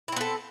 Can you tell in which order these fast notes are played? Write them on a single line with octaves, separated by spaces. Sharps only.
E4 C4 B3 A4